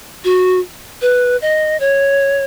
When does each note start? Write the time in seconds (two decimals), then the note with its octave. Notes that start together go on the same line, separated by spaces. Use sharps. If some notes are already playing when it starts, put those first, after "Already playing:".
0.24 F#4
1.02 B4
1.42 D#5
1.80 C#5